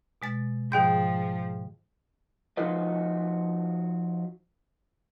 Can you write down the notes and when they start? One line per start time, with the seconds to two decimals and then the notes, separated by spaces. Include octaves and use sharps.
0.22 B2 G#3 A6
0.72 G#2 D#3 F3 G#4 G5 G6
2.57 F3 D#4 F4 F#4 B4 D#5